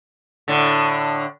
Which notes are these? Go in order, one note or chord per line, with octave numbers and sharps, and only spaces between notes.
A2 D3